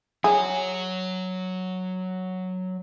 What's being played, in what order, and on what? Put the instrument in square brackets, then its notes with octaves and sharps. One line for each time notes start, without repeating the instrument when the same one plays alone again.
[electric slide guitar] F#3 C#5 [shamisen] G#4